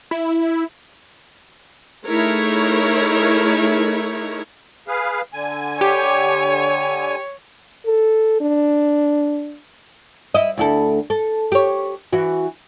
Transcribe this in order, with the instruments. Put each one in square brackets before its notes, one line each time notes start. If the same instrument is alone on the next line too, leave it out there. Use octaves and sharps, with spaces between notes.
[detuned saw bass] E4
[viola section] A3 D#4 E4 G#4 A#4 C#5
[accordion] G#4 B4 F5
D3 G#5
[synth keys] G4 [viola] C#5
[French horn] A4
D4
[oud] E4 D#5
D2 E4 A4
A4
G4 C#5
E3 F#4